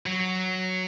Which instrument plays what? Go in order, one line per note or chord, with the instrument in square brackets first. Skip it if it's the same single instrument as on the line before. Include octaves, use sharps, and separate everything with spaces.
[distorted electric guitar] F#3